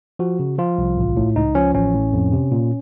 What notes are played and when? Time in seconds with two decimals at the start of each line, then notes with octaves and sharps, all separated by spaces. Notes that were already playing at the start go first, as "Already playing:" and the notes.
0.19 F3 F#4
0.39 C#3
0.58 F3 F4
0.78 C2
0.97 A1
1.17 A2
1.36 C#2 D#4
1.55 F3 C#4
1.74 A1 C#4
1.94 A2
2.13 F2
2.32 C3
2.52 A#2